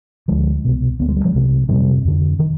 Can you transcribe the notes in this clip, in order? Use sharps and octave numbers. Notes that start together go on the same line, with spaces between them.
D2 D3 F3 G#3
C2 B2
D2 D3 B3
G#3
G3
F3 G#3
C2 C3
F2 C3 D#3 G3
F2 D3
D#3